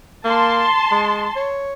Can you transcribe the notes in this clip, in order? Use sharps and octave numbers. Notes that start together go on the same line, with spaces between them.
A#3 A5 C6
G#3
C#5